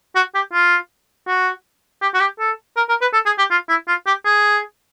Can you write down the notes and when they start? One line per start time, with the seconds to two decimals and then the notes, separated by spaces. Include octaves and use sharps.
0.16 F#4
0.35 G4
0.53 F4
1.27 F#4
2.02 G4
2.14 F#4
2.20 G4
2.40 A4
2.77 A#4
2.89 A#4
3.02 B4
3.13 A4
3.26 G#4
3.39 G4
3.51 F4
3.69 E4
3.88 F4
4.07 G4
4.25 G#4